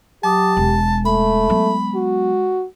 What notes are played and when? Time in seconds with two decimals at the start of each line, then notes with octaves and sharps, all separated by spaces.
0.23 F#3 G4 A5 D6 D#6
0.57 E1 G#3
1.06 A3 B5
1.49 F#3 B3
1.95 F#4